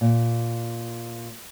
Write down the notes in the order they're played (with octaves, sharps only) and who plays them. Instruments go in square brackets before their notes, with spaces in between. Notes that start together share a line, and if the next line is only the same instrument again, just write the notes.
[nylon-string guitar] A#2